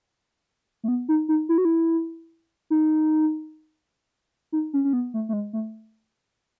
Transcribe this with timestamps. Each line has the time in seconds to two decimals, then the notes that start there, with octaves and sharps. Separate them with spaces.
0.84 A3
0.88 B3
1.09 D#4
1.29 D#4
1.49 E4
1.58 F#4
1.65 E4
2.70 D#4
4.52 D#4
4.73 C#4
4.85 C#4
4.93 B3
5.14 A3
5.29 A3
5.33 G#3
5.53 A3